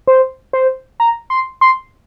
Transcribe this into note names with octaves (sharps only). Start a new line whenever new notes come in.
C5
C5
A#5
C6
C6